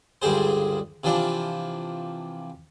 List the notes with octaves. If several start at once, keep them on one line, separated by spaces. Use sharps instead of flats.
C#2 G2 D3 G3 G#4 C5
C3 E3 F3 D4